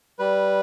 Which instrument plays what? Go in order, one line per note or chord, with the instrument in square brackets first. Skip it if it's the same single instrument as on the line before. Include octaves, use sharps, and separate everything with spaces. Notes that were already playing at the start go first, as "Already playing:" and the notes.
[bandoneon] G3 B4